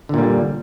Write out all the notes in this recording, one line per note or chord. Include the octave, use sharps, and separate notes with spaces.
A#2 D3 G3